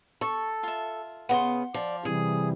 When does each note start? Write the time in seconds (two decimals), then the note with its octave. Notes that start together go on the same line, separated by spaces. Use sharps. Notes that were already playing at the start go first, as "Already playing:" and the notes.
0.21 A4 C#6
0.63 F4 E5
1.29 C#3 B3 F#5 C6
1.74 F3 D5
2.05 C3 E3 G3 G#4